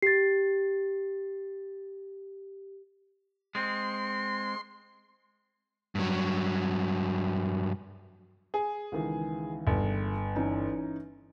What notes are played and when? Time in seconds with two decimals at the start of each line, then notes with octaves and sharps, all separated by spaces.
0.02 G4 A6 C7
3.55 G#3 C4 C6
5.95 G2 F#3
8.54 G#4
8.92 C#2 D#3 E3
9.67 G1
10.36 E3 C#4 D#4